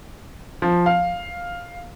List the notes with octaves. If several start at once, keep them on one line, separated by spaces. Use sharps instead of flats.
F3
F5